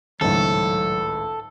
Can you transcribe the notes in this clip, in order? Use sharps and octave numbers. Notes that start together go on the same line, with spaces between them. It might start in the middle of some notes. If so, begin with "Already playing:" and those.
G#1 C#2 A2 F#3 A4